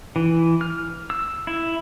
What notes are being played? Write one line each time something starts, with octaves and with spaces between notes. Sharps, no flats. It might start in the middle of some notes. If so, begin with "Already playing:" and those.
E3
F6
E6
E4